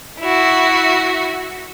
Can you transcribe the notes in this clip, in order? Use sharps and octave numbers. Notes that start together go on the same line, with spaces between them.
E4 F#4